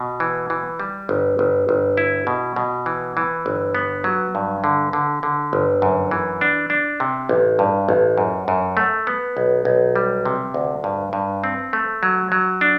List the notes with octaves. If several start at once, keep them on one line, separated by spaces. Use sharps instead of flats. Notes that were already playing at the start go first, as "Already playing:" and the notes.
Already playing: B2
E3
E3
G3
G1
G1
G1
E4
B2
B2
E3
E3
G1
B3
F#3
G2
D3
D3
D3
G1
F#2
E3
D4
D4
C3
A1
G2
A1
F#2
F#2
A3
B3
B1
B1
G3
C3
D2
G2
G2
C4
A3
F#3
F#3
D4